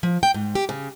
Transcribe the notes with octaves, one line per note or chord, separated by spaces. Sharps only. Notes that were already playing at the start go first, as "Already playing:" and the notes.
F3
G5
G#2
G4
C#3